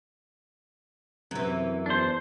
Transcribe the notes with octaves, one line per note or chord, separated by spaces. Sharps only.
F#2 C3 E3
E2 D4 C5